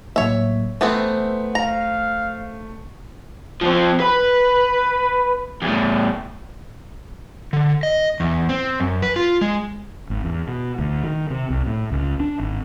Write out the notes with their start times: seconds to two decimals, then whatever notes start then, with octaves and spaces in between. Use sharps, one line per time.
0.16 A2 F#3 A#3 C#5 E5
0.81 E3 A3 B3 C4 C5
1.55 F5 A#5
3.61 F3 C4
4.00 B4
5.62 E2 A2
7.53 D3
7.83 D#5
8.20 E2
8.49 C4
8.80 F#2
9.02 B4
9.16 F4
9.41 G#3
10.10 G#1
10.24 E2
10.48 B2
10.79 D2
11.03 D#3
11.30 C3
11.50 C2
11.66 A2
11.91 C#2
12.20 D4
12.39 G#1